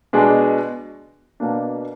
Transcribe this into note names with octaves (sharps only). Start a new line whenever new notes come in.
B2 G#3 D4
B2 A#3 D4